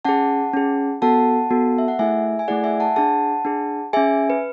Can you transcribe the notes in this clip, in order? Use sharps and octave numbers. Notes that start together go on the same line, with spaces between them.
C#4 G#4 F#5 A5
C#4 G#4
B3 F#4 A4 F#5 A5
B3 F#4 A4
E5
F#5
A3 E4 G#4 E5 G#5
G#5
A3 E4 G#4 D5 F#5
E5 G#5
F#5 A5
D4 G#4 F#5 A5
D4 G#4
C#4 G#4 E5 G#5
B4